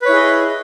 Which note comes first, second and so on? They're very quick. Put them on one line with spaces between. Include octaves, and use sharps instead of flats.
B4 C#5 E4 G#4 D#5